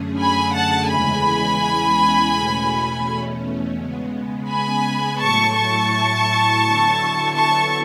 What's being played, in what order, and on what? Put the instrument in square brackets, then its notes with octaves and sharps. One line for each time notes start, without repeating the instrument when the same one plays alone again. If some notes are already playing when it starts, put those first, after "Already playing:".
Already playing: [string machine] F#2 D3 A3 C#4 G#4
[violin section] G#5 B5
F#5 A5
[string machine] E2 C#3 E3 G#3 [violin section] G#5 B5
[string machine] E2 B2 A3 C#4
C#3 G#3 B3
[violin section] G#5 B5
[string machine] A2 F#3 A3 E4 A4 [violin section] A5 C#6
[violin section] A5 C#6
[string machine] D3 F#3 B3 E4 A4
[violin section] A5 C#6